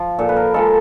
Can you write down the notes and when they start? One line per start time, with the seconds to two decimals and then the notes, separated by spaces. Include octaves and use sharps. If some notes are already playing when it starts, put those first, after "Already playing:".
Already playing: F3
0.19 A#2 A4
0.29 B4
0.36 A#4
0.54 F3 G#3 A4